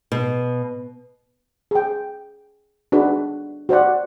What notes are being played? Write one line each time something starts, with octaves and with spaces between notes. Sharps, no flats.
B2
G#4 G5
D4 D#4 F#4 G#4 B4
F#4 C5 D5 F#5